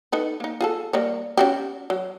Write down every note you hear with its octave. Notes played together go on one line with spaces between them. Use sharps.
D#4 A4 B4
A#3 D#4
F4 G#4 A4
G3 A#3 C#5
C#4 F#4 G4
F#3